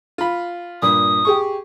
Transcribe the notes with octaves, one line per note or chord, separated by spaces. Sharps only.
F4 B5
G2 A#2 D#6
G4 G#4 C#6